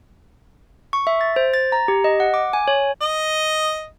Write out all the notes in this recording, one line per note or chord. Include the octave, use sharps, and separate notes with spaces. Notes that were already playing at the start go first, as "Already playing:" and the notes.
C#6
E5
A6
C5
A6
A#5
G4
D#5
F#5
D6
G#5
C#5
D#5